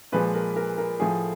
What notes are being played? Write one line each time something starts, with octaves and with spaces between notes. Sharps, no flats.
A#2 F3 G#3 B4
A#4
A#4
A#4
A2 F3 A3 G#4